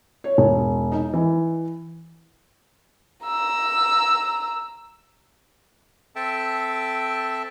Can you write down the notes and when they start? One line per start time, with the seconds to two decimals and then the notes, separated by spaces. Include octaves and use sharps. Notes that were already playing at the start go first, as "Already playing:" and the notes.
0.24 C#5
0.38 E1
0.92 D#4
1.14 E3
3.24 A#5 E6
6.16 C4 A4 E5 G5 A5